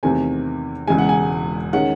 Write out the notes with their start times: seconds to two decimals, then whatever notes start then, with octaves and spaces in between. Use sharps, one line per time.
0.03 E2 C3 D#3 A3 C4 G#5
0.88 E1 E2 C#3 G#3 G#5
0.98 F#5
1.09 G#5
1.73 D#3 G#3 C#4 F#5